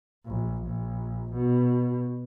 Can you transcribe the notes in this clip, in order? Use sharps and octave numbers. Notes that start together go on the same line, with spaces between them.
A#1
A#1
B2